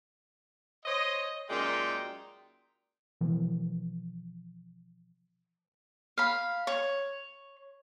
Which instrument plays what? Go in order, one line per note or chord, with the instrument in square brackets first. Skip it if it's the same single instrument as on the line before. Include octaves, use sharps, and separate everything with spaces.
[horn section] C5 C#5 D#5
F#2 A#2 G#3 D#4 G5
[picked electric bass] B2 E3 F3
[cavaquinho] F5 B5
C#5